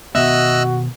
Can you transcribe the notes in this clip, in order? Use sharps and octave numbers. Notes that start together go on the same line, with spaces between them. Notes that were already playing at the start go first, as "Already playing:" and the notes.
B2 D#3 B3 F#4 D#5 E5 E6 F#6